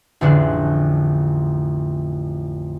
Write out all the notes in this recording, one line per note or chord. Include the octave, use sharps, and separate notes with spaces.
A1 F2 D3 D4 G#4 F#6